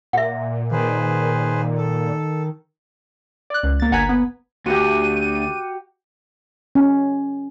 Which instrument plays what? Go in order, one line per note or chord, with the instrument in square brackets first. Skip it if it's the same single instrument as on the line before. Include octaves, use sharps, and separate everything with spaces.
[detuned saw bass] A#2 [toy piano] E5 F#5
[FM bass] D#3 [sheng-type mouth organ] G#4 B4 C5
[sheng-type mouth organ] A4
[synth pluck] D5 F#6
C#2
A#3 A6
G1 F#5 G#5 A#5 G#6 B6
B3
[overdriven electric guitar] D2 [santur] F#4 G4 [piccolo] D#7
[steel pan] C#4